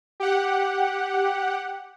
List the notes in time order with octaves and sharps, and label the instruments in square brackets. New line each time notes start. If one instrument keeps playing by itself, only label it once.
[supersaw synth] G4 F#5